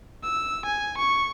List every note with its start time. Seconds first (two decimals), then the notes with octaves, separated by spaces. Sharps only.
0.23 E6
0.66 G#5
0.98 C#6